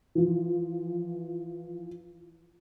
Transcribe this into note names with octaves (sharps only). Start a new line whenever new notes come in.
E3 F3